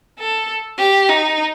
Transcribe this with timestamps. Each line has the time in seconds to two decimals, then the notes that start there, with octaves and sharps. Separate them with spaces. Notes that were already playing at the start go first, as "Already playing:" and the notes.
0.18 A4
0.78 G4
1.09 D#4